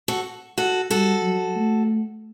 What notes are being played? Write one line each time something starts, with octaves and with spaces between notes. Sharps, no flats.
F#4 A4
F#4 A4
G3 F#4 A4
F#3
A3